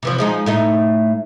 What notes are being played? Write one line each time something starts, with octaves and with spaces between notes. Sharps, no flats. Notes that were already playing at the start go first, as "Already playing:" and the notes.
C3 E3 F3
F3 G#3 D#4
A2 A3 D#4